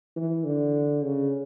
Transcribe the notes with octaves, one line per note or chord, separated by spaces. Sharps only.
E3
D3
C#3